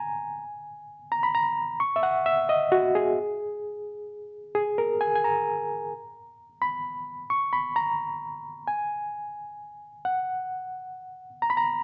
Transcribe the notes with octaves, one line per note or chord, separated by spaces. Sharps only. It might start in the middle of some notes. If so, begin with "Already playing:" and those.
Already playing: G#5 A#5
A#5
B5
A#5
C#6
E5
F#5
E5
D#5
F#4
G#4
G#4
A#4
G#5
G#5
A#5
B5
C#6
B5
A#5
G#5
F#5
A#5
B5
A#5